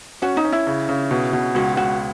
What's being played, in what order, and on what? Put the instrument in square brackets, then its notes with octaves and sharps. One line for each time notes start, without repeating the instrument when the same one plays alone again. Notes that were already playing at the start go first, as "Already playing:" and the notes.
[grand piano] C#4 [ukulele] F#4
[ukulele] D#4
[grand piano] C#4
[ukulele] E4
[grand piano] C#3
C#3
B2
B2
[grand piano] C#2 [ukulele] F#4
[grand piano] C#2 [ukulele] F#4